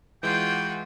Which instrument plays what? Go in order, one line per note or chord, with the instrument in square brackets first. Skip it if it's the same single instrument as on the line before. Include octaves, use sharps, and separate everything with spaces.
[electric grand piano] E3 G#3 G6 [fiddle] F4 F#4 [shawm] G5